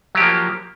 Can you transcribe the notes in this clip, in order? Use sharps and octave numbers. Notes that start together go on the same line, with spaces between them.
F3 F#3 A#3 G4